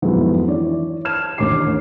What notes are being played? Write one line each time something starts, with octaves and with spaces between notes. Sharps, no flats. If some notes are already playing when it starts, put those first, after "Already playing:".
F2 G#2 F#3 G#3 B3 E4
E3 C#5 D5
A5 F6 G#6 E7
A1 D#2 D3 D6 C7